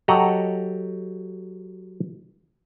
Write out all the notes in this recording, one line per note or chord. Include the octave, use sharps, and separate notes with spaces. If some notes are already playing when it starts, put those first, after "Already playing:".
F#3 G4 A4 D#5 F#5 A#5